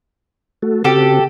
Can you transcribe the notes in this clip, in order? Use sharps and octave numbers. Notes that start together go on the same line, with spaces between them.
A3 F#4 A4
C#3 C4 F#4 G4 A4